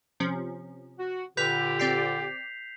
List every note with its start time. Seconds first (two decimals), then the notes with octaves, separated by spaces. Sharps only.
0.20 C3 F3 C#4
0.99 F#4 F#5
1.37 A#2 D3 G4 B4 G6 B6 F7
1.79 C4 D5 G5 C7